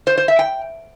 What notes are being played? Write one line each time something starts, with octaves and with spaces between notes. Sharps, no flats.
C5
C5
E5
G5